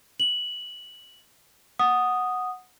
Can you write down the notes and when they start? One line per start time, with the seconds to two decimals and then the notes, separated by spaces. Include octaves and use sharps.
0.20 F#7
1.79 F#5 D#6